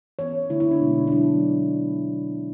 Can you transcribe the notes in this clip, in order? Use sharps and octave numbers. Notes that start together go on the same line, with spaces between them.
E3 B3 C#5
D3 A3 E4
E4
D4
B2 G#3 B3
D4
D3 F#3 B3 E4